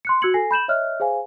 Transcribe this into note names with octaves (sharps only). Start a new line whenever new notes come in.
C6 F#6 C#7
F#4 E6 F#6 G#6 C#7 F#7
A4 G#5 A#6 C7
B5 G6 E7 F#7
C#5 D#5 E5 F6 F#6
G#4 C5 F5 G#5